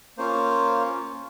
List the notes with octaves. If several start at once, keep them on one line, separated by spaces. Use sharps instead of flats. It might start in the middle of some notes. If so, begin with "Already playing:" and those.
A#3 C#4 F4 C5